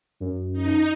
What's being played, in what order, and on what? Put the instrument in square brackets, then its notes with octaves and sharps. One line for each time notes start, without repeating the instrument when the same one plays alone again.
[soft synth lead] F#2
[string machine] D#4